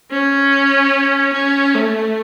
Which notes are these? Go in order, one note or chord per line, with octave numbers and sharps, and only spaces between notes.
C#4
C#4
A3